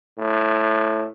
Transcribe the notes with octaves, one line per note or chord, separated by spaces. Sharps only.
A2